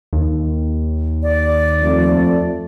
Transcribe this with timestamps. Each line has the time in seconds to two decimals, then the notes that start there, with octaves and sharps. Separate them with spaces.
0.13 D#2
1.23 D5
1.81 F2 A3